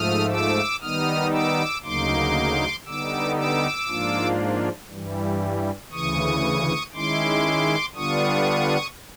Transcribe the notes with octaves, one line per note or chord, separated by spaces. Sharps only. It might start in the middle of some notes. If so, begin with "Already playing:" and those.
Already playing: G#2 F3 A3 D#6 F6
D6 E6
D#3 G3 B3 D#4 D#6 F6
D6 E6
D2 C#3 F#3 A#3 D#4 C6 D6
D3 G3 B3 D#4 D6 E6
D6 E6
G#2 F3 A#3 D4 F4
G2 E3 G3
D2 C#3 E3 C#6 D#6
D#3 G#3 C#4 E4 C6 D6
D3 G3 B3 D4 F4 C#6 D#6